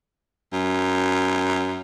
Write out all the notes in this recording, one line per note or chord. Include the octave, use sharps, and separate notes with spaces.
F#2